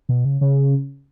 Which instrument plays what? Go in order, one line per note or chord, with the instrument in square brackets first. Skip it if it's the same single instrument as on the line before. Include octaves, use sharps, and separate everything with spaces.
[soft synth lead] B2
C#3
C#3